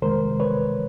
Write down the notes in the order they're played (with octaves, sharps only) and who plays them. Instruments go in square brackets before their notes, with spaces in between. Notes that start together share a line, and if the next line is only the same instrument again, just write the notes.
[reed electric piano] F2 C3 D#3 G#3 A#4 C5
B4 C#5